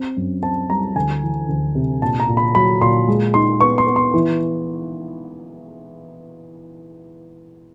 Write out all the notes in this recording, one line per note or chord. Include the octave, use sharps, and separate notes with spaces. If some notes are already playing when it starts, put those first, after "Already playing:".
Already playing: C4
F#2
C4 A5
G3 A#5
D2 G#5
E3
D2
C3
A#2 A5
A#5
A#2
B5
F#3 B5
A#2 C6
G#3
D#4 C6
B3 C#6
C6
B3
C6
E3